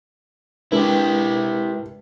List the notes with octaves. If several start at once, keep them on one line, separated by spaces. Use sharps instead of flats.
G#3 D4 E4 G4 A#4 B4